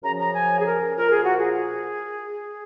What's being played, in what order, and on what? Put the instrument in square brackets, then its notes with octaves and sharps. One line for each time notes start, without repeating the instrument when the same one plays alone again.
[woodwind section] F#2 C#3 F3 A#5
A#5
G#5
G#4
A#4
A#2 F3 A#4
G#4
F#4
G#4